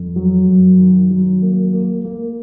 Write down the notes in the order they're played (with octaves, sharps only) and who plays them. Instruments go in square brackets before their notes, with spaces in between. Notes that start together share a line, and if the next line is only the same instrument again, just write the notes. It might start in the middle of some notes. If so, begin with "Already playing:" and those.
Already playing: [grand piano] F2
F#3
F#2
D#3
F#3
A#3
A#3
A#3